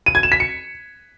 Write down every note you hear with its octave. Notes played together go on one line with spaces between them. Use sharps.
D#7
G#6
E7
B6
C#7